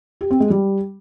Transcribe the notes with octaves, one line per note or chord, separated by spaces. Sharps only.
G4
C4
G#3
G3